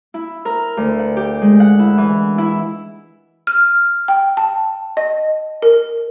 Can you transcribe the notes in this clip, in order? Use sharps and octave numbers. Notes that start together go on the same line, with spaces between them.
E4
A#4
D2
F#5
G4
G#3
F#5
E4
E3
E4
F6
G5
A5
D#5
A#4